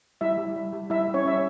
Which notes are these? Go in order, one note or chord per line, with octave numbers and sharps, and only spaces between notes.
G3 E4 E5
G3
G3
G3
G3 E4 E5
G3
C#4 C#5
G3 E5